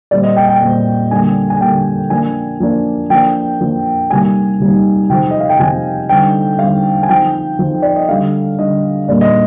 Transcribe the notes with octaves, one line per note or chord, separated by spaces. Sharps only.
A#2 G3 C4 D5
D#5
G5
G5
A#2 G3 C4
D3 G3 A#3 G#5
G#5
D3 G3 A#3 G5
F3 A#3 D4 G#5
F3 A#3 D4
F3 A#3 D4 G5
F3 A#3 D4
C3 G3 A#3 D#4 G#5
C3 G3 A#3 D#4
C3 F3 C4 D#4 G5
D#5
F5
G5
C3 F3 C4 D#4 G#5
D3 G3 C4 D#4 G5
D3 G3 C4 D#4 F5
G#5
F3 C4 D#4 G5
F3 C4 D#4
D5
D#5
D3 G3 D4 F5
D3 G3 D4 D#5
A#2 G3 A#3 D4 D5
D#5